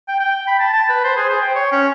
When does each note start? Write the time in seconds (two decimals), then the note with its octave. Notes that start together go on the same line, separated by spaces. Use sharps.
0.08 G5
0.20 G5
0.48 B5
0.59 A5
0.73 A5
0.89 B4
1.04 C5
1.17 G#4
1.29 C5
1.42 G5
1.55 C#5
1.72 C#4